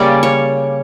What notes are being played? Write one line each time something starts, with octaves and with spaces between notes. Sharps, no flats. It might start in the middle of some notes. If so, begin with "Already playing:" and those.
Already playing: C#3 G3 A#3 C#4 D5
C#5